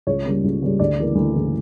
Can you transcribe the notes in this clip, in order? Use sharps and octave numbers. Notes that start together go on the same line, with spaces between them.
C#2 C#5
C#3 G3 A#3 C#4
C#2
C#3 G3 A#3 C#4
D2 D5
C#3 E3 A#3
D2
C#3 E3 A#3